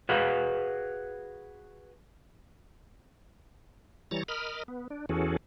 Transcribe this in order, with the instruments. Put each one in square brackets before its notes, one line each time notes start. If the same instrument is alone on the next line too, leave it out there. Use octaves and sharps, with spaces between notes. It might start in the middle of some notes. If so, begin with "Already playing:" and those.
[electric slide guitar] F#4 G#4 B4 F5
[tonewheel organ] E3 G3 C#5 A#5 A6
A#4 D#5 B5 F6
B3
D4
E2 E3 C#4 F#4 G#4 A4